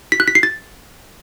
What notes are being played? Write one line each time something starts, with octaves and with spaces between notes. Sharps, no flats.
B6
F#6
B6
C7
A6